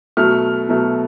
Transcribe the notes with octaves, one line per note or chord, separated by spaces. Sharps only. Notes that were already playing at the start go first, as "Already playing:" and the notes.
B2 F#3 A3 F6
B2 F#3 A3